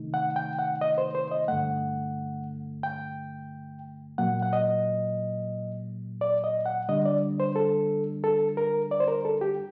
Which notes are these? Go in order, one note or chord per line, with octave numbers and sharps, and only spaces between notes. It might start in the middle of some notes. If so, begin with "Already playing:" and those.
Already playing: C3 D#3 A3 D#4
F#5
G5
F#5
D#5
C5
C5
D#5
G2 D3 A3 F#5
G5
A#2 F#3 A#3 F#5
F#5
D#5
D5
D#5
F#5
D3 G3 D4 D#5
D5
C5
A4
A4
A#4
D5
C5
A#4
A4
G4